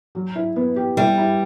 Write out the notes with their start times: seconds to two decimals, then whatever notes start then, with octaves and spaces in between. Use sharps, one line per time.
0.15 F#3
0.35 E4
0.56 B3
0.76 G4
0.97 G3 E4
1.18 E4